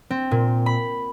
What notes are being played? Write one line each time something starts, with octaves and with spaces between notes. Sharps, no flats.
C4
A#2
B5